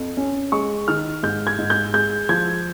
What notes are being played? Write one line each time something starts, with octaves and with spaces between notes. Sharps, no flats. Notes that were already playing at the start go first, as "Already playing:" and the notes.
Already playing: F2
C#4
G#3 C#6
D#3 F6
G#2 G6
G#6
G#2
G6
G#3 G6
F3 G#6